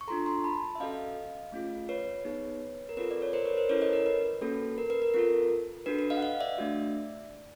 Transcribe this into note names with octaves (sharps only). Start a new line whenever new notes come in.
C#6
D4 F4 A4 A#5 C6
A#5 C6
A5 B5
E5
C#4 F#4 A4 D#5 F5
A3 C#4 F4 G#4
B4 C#5
B3 D#4 G#4
A#4
C4 F4 A4 B4
D5
C#5
A#4 C5
B4 C#5
A#4 C5
C#4 E4 A4 B4 C#5
C#5 D#5
A#4
B4
A#3 C#4 F#4 A4
A#4
B4
A#4
C4 F4 A4 A#4
D4 F#4 A4 B4
B4
D#5 F5
F#5
D#5 F5
D5 E5
A3 D4 F#4